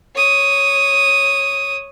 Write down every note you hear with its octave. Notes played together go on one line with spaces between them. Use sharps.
C#5 D#6